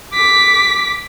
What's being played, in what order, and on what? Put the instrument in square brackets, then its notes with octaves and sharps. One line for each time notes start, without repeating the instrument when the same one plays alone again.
[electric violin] D6 B6